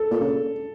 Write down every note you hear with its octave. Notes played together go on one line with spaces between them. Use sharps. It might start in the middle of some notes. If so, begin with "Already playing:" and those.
Already playing: A4
A#2
C#3